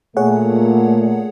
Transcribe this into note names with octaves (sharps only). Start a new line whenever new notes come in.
A#2 A3 G#4 C#5 F#5